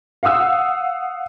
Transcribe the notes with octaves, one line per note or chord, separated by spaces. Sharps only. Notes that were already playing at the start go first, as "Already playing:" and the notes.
F5 F#5 D#6 E6